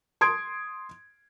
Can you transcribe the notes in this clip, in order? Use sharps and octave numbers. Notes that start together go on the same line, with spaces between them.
C6 D#6 G#6 D7